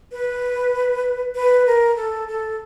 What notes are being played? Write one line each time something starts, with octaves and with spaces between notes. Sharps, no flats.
B4
B4
A#4
A4
A4